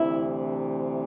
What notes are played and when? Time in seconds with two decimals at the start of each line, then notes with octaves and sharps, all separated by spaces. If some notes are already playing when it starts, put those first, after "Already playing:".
Already playing: D2 C3 E3 E4